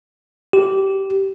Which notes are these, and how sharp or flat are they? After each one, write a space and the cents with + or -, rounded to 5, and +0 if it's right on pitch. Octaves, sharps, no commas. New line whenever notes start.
G4 -15